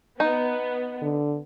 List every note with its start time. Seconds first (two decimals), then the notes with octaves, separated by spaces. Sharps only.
0.20 B3 D#4
1.02 D3